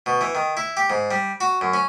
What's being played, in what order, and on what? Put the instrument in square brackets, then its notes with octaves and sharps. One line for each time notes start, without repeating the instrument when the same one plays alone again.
[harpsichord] B2
E3
D#3
E4
G4
G#2
G3
F#4
F#2
C#4